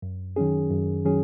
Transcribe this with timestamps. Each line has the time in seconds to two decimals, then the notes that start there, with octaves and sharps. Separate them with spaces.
0.02 F#2
0.36 D#3 F#3 C#4 G#4
0.71 F#2
1.05 D#3 F#3 C#4 G#4